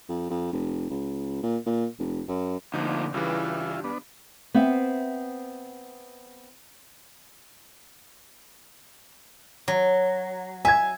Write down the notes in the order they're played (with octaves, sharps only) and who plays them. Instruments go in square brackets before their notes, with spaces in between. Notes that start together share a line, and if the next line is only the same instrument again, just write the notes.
[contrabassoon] F2
F2
F1
C#2
A#2
A#2
F1
F#2
[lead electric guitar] D2 A#2 [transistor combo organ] D3 [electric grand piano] F3 D#4
[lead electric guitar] G2 [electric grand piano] C#3 E3 [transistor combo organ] E4 F4
[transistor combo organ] B3 D4
[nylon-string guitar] B3 C4 C5 E5
[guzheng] F#3
[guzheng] E5 [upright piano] G#5 G#6